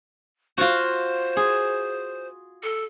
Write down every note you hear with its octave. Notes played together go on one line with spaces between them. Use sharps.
F4 F#4 C5
G#4
A4